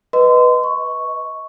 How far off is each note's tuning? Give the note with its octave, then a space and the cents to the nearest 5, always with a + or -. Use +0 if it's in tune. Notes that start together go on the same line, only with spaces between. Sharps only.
B4 +0 D#5 +0 C6 -25
D#5 +30 C#6 +0